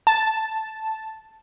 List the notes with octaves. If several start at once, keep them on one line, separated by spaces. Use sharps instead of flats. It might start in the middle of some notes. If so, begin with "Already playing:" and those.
A5